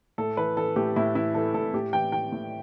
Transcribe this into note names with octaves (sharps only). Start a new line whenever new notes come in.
A2 A4
E3 B4
E3 A4
A2 G4
A2 E4
E3 E4
E3 A4
A2 A4
A2 G4
E3 G5
E3 G5
A2